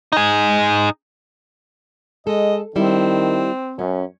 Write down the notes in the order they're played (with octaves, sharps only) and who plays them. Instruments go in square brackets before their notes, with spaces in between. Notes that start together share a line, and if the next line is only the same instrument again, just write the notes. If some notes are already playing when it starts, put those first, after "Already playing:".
[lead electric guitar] D#4 G#4
[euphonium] G#3 [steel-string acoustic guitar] A4 [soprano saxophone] D#5
[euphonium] D#3 [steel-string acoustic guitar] G3 E4 [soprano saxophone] C4
[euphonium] F#2 [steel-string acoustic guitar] C#4